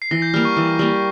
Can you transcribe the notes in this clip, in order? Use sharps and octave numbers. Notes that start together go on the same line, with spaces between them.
C7
E3 A#6
G6
G3 A#3 F6
C#6
E3
G3 A#3